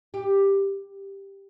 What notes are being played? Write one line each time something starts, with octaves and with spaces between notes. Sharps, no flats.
G4